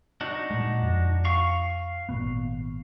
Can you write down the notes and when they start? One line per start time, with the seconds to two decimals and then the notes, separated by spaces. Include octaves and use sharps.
0.21 D4 D#4 F#4
0.51 A#2 G#3
0.83 F2
1.25 F5 C#6
2.09 G#1 A#2 B3